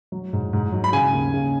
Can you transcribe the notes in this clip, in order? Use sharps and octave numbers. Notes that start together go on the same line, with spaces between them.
F#3
G#2
G#2
F#3
B5
C#3 G#5
D#2
C#3